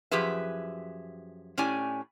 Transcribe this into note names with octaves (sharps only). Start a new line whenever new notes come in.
F#2 F3 G4 G#4 B4 E5
A2 C#4 G4 D5 G#5